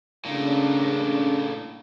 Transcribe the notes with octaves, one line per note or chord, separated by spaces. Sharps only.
A2 C#3 A#3 D4